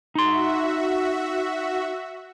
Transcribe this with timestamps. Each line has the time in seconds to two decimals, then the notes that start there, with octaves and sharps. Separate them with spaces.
0.15 D#4 F#4 E5 C6